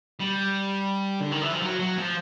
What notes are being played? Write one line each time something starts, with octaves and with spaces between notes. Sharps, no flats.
G3
D3
D#3
E3
F3
F#3
F#3
F3